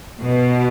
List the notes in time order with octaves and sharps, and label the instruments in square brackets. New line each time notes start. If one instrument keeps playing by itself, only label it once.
[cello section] B2